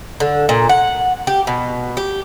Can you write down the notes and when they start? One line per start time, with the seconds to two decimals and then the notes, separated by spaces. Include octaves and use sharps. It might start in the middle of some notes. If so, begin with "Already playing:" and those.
0.20 D3
0.49 A#2
0.69 F#5
1.27 G4
1.47 B2
1.97 G4